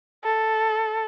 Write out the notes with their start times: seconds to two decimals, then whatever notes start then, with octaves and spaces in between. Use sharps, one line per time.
0.24 A4